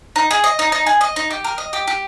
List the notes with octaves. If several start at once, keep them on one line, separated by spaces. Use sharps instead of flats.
D#4
G#4
D#5
D#4
D#4
G#4
D#5
D#4
G4
A#4
D#5
G4
G4